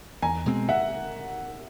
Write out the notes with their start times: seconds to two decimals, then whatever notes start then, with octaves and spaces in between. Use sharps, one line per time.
0.22 E2 G#5 A#5
0.46 B2 G#3 C4
0.69 E5 F#5